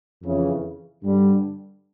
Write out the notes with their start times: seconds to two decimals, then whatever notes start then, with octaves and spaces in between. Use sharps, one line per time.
0.21 F2 C#3 E3
1.03 G2 D3 G3